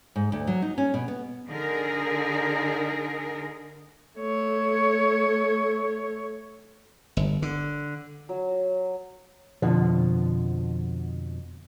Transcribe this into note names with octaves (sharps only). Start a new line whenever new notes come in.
G#2
D2
F#3
D#4
C#4
B2
B3
D3 D#4 G#4 A#4
A3 C#5
G1
D3
F#3
F2 B2 D3 F3